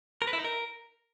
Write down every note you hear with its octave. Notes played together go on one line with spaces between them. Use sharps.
A#4
B4
E4
D#4
A#4